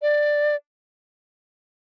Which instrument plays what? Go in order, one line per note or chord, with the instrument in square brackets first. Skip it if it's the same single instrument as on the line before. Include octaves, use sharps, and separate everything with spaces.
[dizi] D5